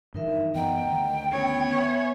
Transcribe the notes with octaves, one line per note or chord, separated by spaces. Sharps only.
G2 D#3 E3 D#4 A#4 E5
F#2 E3 B3 D#5 F#5 G5 A#5
D2 D#3
B3 C#4 E4 C#5
E5 G#5